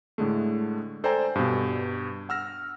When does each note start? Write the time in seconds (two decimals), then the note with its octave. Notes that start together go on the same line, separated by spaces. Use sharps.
0.18 A2 D3 G#3 A3
1.04 A4 C5 D5 G5 G#5 A#5
1.35 G2 B2
2.29 F#5 E6 F6 A#6